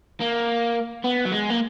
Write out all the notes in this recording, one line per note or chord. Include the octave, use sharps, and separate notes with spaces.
A#3
B3
F#3
G#3
A#3